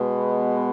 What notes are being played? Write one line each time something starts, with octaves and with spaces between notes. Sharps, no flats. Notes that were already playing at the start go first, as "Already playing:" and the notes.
Already playing: B2 G#3 B3